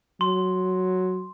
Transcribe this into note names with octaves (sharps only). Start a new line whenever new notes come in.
F#3 C6